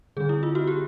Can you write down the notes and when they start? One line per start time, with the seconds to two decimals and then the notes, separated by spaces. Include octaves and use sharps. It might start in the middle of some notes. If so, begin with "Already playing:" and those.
0.17 D3 G3 C4 G#4
0.29 E4
0.43 F4
0.55 F#4
0.67 G4